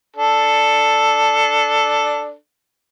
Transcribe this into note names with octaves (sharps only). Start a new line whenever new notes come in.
D4 A4